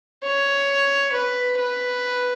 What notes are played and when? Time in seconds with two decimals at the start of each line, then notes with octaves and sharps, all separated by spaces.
0.23 C#5
1.13 B4
1.57 B4